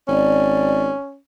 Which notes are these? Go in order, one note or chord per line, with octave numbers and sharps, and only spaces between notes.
G#1 C#4 D5